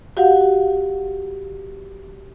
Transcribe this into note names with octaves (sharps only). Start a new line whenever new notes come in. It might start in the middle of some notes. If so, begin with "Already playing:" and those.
F#4 G4 F5 F#5